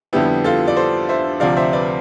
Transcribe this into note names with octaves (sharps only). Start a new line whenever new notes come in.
F2 D3 G3 B3 E4 G4
F4 A4
D5
A4 C5
C5 E5
D2 C3 F3 D5 F5
C5 E5
B4 D5